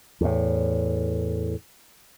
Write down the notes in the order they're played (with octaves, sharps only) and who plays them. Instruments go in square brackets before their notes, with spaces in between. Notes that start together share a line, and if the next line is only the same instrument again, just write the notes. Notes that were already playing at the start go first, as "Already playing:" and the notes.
[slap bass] E2 A2